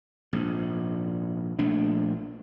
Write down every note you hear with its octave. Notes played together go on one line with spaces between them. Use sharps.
A#1 G#2
A#1 F3 A3 D4